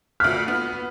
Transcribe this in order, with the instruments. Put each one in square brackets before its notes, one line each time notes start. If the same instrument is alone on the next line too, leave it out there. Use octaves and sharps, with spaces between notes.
[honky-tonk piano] D2 F4 B6 [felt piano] F6
[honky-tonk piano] B3